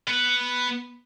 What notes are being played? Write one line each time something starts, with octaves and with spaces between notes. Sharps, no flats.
B3 B4